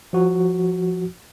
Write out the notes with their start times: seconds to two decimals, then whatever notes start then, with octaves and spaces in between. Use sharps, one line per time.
0.13 F3 F#4